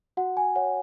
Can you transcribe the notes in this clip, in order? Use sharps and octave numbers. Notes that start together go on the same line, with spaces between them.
F#4 F#5
G#5
C#5 F#5